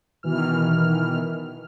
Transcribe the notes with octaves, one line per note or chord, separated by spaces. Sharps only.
B2 D#3 E3 F6